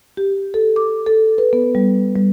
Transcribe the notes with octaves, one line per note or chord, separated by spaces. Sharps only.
G4
A4
D6
A4
B4
B3
G3
G3